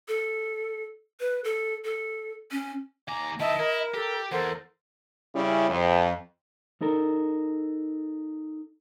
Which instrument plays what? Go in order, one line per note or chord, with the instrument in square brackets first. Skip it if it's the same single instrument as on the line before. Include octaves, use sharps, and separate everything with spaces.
[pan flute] A4
B4
A4
A4
C#4
[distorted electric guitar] D#2 A#5 [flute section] G#5 D6
[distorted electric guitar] D#3 E4 [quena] D#5 [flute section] E5 A5
[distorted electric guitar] E4 [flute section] A#4
[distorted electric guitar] G4 [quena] A4
[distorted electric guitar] E2 [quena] A4 [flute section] A#4 C5 F#5
[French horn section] C#3 G3 C#4 E4
F2
[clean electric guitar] D#4 A4 A#4